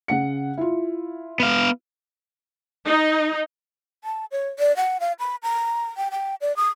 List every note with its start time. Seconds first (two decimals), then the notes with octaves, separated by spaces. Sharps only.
0.08 C#3 F#5 C#7
0.58 E4 F4
1.40 B3 F5
2.86 D#4
4.04 A5
4.32 C#5
4.59 D5
4.77 F#5
5.00 F5
5.19 B5
5.43 A#5
5.97 G5
6.11 G5
6.41 D5
6.57 D#6